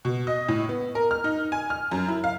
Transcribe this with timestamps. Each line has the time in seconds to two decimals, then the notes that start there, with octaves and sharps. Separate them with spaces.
0.05 B2
0.27 D#5
0.48 A2
0.69 B3
0.95 A#4
1.11 F6
1.24 D#4
1.52 G#5
1.70 F6
1.91 F#2
2.08 E4
2.24 F5